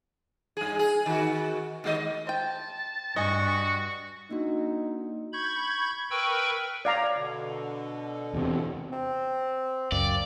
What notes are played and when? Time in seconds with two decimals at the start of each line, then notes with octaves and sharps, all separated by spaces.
0.57 G2 G#4
0.79 G#4
1.06 D#3 F#4
1.84 D#2 G#3 D#5
2.27 C5 G5 A5
3.16 G2 F#4 D#5 G#5 C#6
4.31 A#3 D4 D#4 F#4
5.33 B5 C#6 G6 G#6
6.10 A#4 B4 G5 B5 C#6 E6
6.85 C#5 D5 F5 A#5
7.17 B2 D3
8.34 E2 C3
8.93 C4
9.92 C#2 F#2 A#3 D5